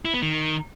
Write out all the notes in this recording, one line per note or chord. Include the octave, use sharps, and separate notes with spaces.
E4
B3
D#3